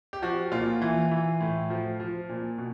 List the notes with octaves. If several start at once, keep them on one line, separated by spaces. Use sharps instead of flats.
G4
F3 F#4
A#2 F4
E3
E3
A2
F3
F3
A#2
B2